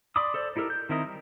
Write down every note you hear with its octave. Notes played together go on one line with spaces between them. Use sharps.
D5 B5 C6 D6 D#6
A4 C5 D5
D#4 E4 G4 A4 A#4
G6
D#3 C4 E4 A#4 D#5
G3